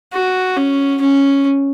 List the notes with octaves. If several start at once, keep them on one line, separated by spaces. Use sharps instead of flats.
F#4
C#4
C#4